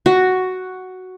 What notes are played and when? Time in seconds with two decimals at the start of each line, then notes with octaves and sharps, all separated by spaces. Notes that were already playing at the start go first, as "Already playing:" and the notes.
0.06 F#4